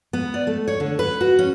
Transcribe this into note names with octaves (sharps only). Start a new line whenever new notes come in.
B3
D5
A3
C#5
D3
B4
F#4
C#4